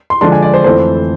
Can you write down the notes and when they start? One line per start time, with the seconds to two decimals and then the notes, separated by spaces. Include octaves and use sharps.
0.10 C6
0.21 D3 F3 G#3 D4 C6
0.32 G#5
0.42 D5
0.54 C5
0.64 F2 E3 A3 C4 F4 C5